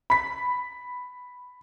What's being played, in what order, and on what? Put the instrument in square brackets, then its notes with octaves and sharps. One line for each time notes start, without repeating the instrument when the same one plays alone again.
[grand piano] B5 B6